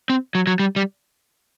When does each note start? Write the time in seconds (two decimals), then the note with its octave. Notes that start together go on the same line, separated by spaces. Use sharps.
0.10 C4
0.35 F#3
0.47 F#3
0.60 G3
0.76 G3